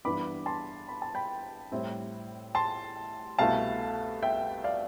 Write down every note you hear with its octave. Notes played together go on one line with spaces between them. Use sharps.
G2 E3 B3 D4 B5 D6
A5 C6
B5
A5
G5 B5
A2 G3 C4 E4
A5 C6
C2 B2 A3 E4 F5 A5
E5 G5
D5 F5